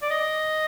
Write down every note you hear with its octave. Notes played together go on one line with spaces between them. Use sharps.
D5
D#5